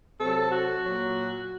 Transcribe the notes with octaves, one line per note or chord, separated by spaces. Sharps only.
C3 F#3 A4
F#4
A#2 F#3